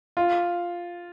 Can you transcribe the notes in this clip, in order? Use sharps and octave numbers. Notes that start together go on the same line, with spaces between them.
F4